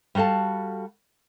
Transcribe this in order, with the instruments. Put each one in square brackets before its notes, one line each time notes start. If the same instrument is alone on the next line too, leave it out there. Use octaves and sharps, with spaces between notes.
[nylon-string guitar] G3 F#4 A4 F5 A5